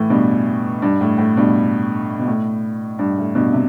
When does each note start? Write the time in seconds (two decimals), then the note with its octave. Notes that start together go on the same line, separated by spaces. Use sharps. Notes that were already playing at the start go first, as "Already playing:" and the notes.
Already playing: A2 E3
0.10 G2 B2
0.82 G2
1.01 A2
1.18 A2
1.36 G2 B2
2.19 B2
2.27 A2
2.99 G2
3.18 A2
3.35 G2 B2
3.53 C3